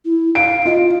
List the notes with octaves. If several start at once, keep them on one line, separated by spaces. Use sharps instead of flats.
E4
F5 D7
F4 D#5